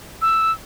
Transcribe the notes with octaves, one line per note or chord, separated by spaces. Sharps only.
E6